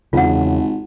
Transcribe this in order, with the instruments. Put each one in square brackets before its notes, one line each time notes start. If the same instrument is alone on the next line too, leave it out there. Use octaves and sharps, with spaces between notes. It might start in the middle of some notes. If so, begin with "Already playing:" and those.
[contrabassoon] G#1 [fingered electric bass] E2 C#3 [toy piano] F4 F#5